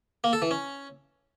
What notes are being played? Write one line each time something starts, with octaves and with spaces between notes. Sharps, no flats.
A#3
A4
E3
C#4